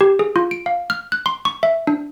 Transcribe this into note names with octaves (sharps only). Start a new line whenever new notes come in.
G4
G#4
F4
D7
F5
F6
F#6
C6
C#6
E5
D4